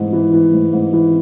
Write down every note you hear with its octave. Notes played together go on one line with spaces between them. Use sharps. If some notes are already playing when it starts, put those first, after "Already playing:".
Already playing: G#2 E3
E3
E3
G#2
G#2
E3